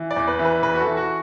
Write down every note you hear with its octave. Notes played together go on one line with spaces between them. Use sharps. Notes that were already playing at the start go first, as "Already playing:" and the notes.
Already playing: E3
D5
E2
B4
E3
B4
E2 B4
F#4
A4
E3
F#4